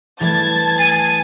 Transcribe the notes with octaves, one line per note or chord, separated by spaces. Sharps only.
E3 G3 A3 A5 G#6 A6
G#5